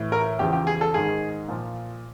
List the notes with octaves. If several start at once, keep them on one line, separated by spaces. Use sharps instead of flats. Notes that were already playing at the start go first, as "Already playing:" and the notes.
Already playing: A2 E3
A#4
E2 C#3 F3 G4
G4
G#4
A4
G#2 D#3 G#4
A#2 F3